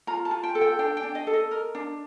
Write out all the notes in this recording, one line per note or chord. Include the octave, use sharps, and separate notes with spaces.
F4 A#5
A5
F4
G5
A4
G5
D4 G5
G5
D4
D#5
A4
D#5
A#4
D4